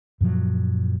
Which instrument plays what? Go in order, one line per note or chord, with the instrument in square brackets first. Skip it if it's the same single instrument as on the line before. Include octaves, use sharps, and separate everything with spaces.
[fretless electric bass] F#2 A#2 F3 F#3